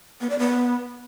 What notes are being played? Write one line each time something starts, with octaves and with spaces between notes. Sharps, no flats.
B3
D5
B3